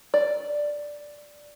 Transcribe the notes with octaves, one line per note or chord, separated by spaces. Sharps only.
D5